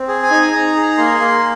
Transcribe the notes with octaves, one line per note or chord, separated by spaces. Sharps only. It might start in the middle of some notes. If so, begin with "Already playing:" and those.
Already playing: C4
G#4
G#5
D#4
D#4 A#5
G#4
A#3 C6
A#3